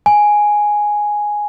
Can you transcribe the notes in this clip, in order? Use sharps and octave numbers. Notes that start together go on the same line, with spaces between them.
G#5